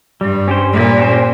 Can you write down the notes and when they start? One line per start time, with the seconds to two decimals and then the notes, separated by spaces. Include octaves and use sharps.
0.21 G2 G3
0.48 C#4 G4 C5
0.73 A#2 G3
0.99 C#4 G4 C5